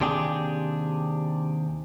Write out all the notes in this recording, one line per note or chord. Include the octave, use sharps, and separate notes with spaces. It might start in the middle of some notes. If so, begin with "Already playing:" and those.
D#2 C3 D4 G4 G#4